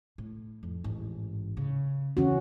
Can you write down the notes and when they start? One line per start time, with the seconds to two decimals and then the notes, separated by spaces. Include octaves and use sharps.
0.18 A2
0.63 F2
0.84 A1 G#2
1.57 C#3
2.17 C#3 E3 C#4 F#4